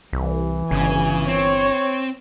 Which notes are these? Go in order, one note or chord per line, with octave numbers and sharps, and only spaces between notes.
C2 E3
G1 C#3 G#5
C4 C#5